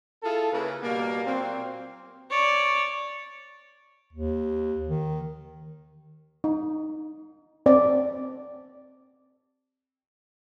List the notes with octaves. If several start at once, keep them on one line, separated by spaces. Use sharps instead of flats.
E4 F4 G#4 A4
C#3 A#3 E4 G#4 B4
B2 G3 A#3
A#2 F#3 A#3 C4
C#5 D5
D#2
D#3
D#4
C4 D5